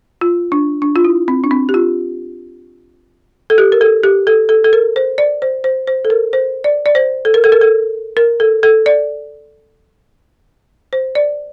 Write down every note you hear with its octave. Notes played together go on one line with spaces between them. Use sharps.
F4
D4
D4
F4
E4
C4
D4
C4
G4
F4
A4
G4
A#4
A4
G4
A4
A4
A4
A#4
C5
D5
C5
C5
C5
A4
A#4
C5
D5
D5
C5
A4
A#4
A4
A#4
A4
A#4
A4
A4
D5
C5
D5